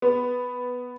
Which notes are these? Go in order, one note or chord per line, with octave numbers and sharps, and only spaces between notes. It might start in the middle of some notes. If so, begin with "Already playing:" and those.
B3